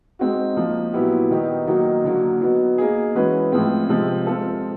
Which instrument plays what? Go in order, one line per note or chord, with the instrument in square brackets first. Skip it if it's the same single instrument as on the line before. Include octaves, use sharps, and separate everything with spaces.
[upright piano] G#3 C4 D#4 F#4
F3 A#3 D#4
A#2 F#3 B3 E4 G4
D#3 G3 B3 D#4 G4
D#3 F#3 A#3 D#4 F#4
D3 F#3 A#3
F#3 B3 D#4
A#3 D#4 G#4
E3 G#3 C#4 F#4 B4
A2 F3 G#3 C4
C3 F3 G#3 C4
G#3 C4 F4 A4